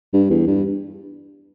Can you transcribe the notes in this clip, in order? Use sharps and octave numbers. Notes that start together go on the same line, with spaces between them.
G2
E2
G2